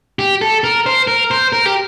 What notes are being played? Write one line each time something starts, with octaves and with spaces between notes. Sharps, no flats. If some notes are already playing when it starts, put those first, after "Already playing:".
G4
A4
A#4
C5
A#4
C5
A#4
G4